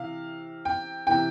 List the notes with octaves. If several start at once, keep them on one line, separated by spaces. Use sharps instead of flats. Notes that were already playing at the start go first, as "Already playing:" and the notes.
Already playing: C3 E3 F5
G5
C3 E3 G5